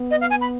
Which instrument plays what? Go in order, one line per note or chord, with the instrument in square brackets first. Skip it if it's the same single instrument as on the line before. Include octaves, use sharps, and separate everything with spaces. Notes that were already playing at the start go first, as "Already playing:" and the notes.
Already playing: [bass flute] B3
[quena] D#5
F5
G#5
B5